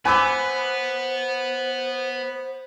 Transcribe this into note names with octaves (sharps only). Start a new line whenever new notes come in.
B3 B4 C5 G#5 D6 E6